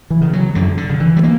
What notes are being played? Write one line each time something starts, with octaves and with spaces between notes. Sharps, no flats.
E3
C#3
F#3
F#2 D3
D3
C#3
E3
G3
A#3